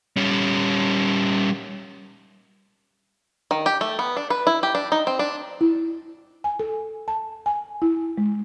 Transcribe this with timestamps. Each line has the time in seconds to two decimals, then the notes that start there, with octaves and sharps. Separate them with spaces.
0.17 G3 C#4
3.51 D#3
3.66 G4
3.81 A3
3.99 B3
4.17 D4
4.30 B4
4.47 E4
4.63 G4
4.75 D4
4.92 D#4
5.07 C4
5.19 D4
5.61 E4
6.44 G#5
6.60 A4
7.08 A5
7.46 G#5
7.82 E4
8.18 G#3